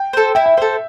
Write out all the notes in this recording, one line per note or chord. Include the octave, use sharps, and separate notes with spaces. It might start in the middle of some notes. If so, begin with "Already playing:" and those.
Already playing: G5
A4 C5
E4 G5
G5
A4 C5 E5